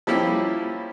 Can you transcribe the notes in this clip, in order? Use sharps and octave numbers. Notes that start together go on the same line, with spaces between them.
F3 G3 A#3 C#4 E4 G4